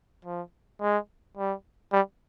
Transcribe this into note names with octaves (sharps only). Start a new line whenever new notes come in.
F3
G#3
G3
G3